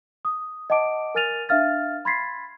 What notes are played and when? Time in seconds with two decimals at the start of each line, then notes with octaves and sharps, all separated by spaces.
0.25 D#6
0.70 D#5 F#5 A5 D6 D7
1.15 A#4 G#5 F6 A6 D#7 F7
1.49 D4 E5 F5 F6 A6
2.05 B5 C6 G#6 A6 B6 C7